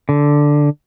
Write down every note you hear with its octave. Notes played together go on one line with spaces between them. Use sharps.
D3